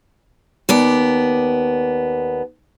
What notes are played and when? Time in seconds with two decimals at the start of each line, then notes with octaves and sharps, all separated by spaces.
0.69 D#2 B3 D5